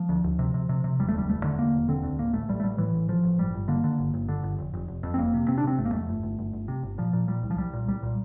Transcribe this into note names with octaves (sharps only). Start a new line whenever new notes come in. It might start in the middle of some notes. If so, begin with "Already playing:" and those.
Already playing: F3
D2
D2
C3
C3
C3
C3
E1 G3
A3
D2 G3
E1 A3
D3
E1 A#3
E1
D3 C4
D2
A1 A#3
A1 A3
A1 G3
A3
A1 G3
A2 E3
A1
A1 F3
A1
G1 G3
G1
D3 A#3
D3
G1
G1
D3
G1
F1
F1
F1
F2
C4
F1 A#3
C3
C3 C4
D4
C3 C4
G1 A3
A#3
F2 A3
G1
G1
G1
G1
C3
G1
A#2 F3
A#2
A#2 G3
C2
F3
C2 G3
A#2
C2 G3
A#2